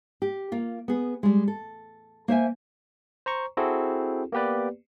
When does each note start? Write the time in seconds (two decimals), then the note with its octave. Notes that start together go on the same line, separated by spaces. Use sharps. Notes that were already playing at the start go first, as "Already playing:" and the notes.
0.22 G4
0.52 A#3 F4
0.88 B3 G#4
1.23 G3 G#3
1.48 A4
2.28 A#3 C5 E5 G#5
3.26 C5 A#5 C#6
3.57 C4 E4 F#4 G#4 A4
4.32 A#3 B3 G4 B4 D5